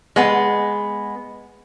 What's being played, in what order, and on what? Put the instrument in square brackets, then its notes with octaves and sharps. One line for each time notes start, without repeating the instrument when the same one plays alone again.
[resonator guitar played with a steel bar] G#3 B3